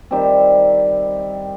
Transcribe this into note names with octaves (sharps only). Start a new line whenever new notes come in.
D#3 G3 C4